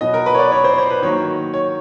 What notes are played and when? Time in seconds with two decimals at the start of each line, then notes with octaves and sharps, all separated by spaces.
0.01 B2 F#3 B3 D#5
0.14 A#4
0.26 B4
0.34 C#5
0.39 D5
0.52 C#5
0.64 C5
0.78 C5
0.90 B4
1.02 D#3 F#3 A#3 C#5
1.54 C#5